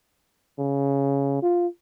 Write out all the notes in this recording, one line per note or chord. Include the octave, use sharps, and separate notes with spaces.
C#3
F4